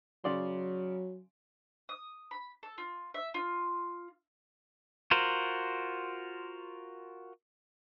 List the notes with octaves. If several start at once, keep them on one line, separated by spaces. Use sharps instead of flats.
C#3 F#3 D5 C6
D#6
B5
A4
F4
E5
F4
F4 F#4 A#4 C5